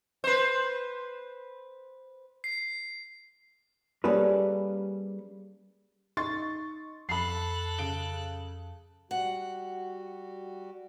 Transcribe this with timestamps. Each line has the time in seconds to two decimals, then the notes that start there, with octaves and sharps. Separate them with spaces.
0.24 B4 C5
2.44 C7
4.04 G3 A#3 C#4 G#4 A4 B4
6.17 D#4 C6 C#6 A6
7.09 F2 A4 A5 B5 F#6 C7
7.78 C#3 D7 G7
9.11 G3 F#4 F#5